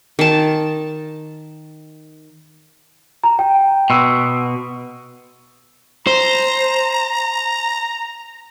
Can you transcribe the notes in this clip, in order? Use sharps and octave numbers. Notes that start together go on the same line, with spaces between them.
D#3 A5
A#5
G5
B2 C6 E6
C5 A#5